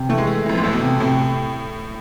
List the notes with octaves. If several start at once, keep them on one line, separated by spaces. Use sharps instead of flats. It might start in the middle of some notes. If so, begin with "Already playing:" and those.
Already playing: C3
E3 A3
G#3
A3
F2 E3
G#2
A2 A3
B2
C3
A2 C3